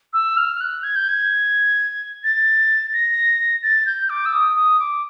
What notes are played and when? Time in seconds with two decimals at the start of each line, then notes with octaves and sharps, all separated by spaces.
0.13 E6
0.37 F6
0.60 F#6
0.83 G#6
0.95 G6
1.08 G#6
2.23 A6
2.93 A#6
3.63 A6
3.86 G6
4.09 D6
4.25 E6
4.32 D#6
4.56 D#6
4.79 D6